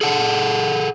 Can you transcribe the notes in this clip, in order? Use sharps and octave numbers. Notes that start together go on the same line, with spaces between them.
G#4 A4 F#5 A5